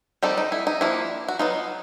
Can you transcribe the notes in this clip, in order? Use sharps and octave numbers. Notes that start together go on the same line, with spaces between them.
D#3 G3 C4 D#4 A4
D#4
E4
D#4
F3 A#3 D4 E4
F#4
F#3 B3 D#4 F4